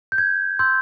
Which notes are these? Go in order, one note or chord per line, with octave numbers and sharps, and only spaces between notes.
G6
G#6
C6 E6 G6